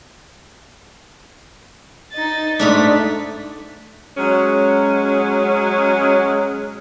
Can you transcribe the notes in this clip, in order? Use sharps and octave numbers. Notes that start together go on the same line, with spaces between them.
D#4 A6
G#2 A3 D4 B6
F#3 G#3 C#4